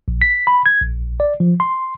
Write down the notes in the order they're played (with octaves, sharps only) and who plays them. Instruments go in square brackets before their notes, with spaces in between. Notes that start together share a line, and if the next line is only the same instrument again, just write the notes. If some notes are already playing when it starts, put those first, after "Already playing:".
[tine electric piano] A#1
B6
B5
G#6
A#1
D5
F3
C6